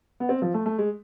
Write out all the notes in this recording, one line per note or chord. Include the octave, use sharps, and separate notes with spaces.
B3
C4
F3
A3
A3
G#3